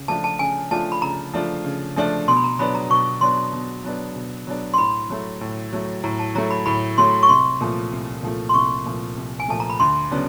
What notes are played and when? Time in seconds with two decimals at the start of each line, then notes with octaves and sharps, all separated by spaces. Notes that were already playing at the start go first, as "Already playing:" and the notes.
Already playing: C#3
0.08 F3 A3 D4 F4 A5
0.24 A5
0.39 C#3 G#5
0.71 F3 A3 D4 F4 A5
0.92 B5
1.02 C#3 A#5
1.33 F3 A3 D4 F4
1.64 C#3
1.96 F3 A3 D4 F4
2.28 B2 C6
2.37 B5
2.44 A#5
2.59 F#3 B3 D4 B5
2.75 A#5
2.90 B2 C#6
3.21 F#3 B3 D4 C6
3.53 B2
3.84 F#3 B3 D4
4.16 B2
4.47 F#3 B3 D4
4.74 C6
4.78 A2 B5
5.10 F#3 A3
5.41 A2
5.72 F#3 A3
6.04 A2 A#5
6.19 A5
6.35 F#3 A3 A#5
6.51 B5
6.66 A2 B5
6.98 F#3 A3 C6
7.23 C#6
7.29 C2 C6
7.61 A#2 F3 A3
7.92 C2
8.23 A#2 F3 A3
8.49 C6
8.54 C2 C#6
8.86 A#2 F3 A3
9.17 C2
9.40 G#5
9.48 A#2 F3 A3 A5
9.60 A#5
9.70 B5
9.80 D2 C6
10.11 C#3 F#3 B3 D4